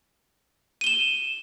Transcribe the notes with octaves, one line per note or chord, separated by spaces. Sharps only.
D#7 E7 G7